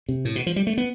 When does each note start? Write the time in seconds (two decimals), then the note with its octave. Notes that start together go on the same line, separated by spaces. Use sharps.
0.09 C3
0.25 A2
0.36 B2
0.47 F3
0.56 G3
0.67 A3
0.78 B3